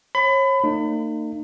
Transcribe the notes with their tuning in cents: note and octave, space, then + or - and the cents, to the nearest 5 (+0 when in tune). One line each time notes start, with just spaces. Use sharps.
C#5 -35 B5 +30
A#3 -45 D#4 -35